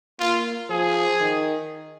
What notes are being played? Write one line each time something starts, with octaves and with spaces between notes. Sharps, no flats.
A#3 F4
F3 G#4
D#3